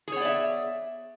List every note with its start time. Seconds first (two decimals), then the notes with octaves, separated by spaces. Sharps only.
0.08 G#4
0.12 C#5
0.16 B3
0.21 D5
0.25 E5